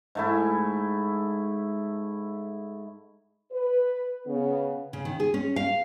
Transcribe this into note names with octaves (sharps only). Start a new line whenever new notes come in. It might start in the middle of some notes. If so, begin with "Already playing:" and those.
G#2 A3 E4
B4
C#3 B3
C#3
D#3
G#4
C#4
F5